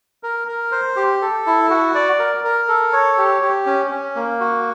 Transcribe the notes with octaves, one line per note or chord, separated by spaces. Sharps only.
A#4
A#4
C5
G4
A4
E4
F#4
D5
A#4
A#4
A4
C#5
G4
G4
C#4
C#4
A#3
F#4